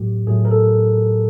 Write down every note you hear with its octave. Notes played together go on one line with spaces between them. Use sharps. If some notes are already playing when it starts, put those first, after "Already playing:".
Already playing: A2 F#3 A3 G4
A2 F#3 A3 G#4
A#4
A4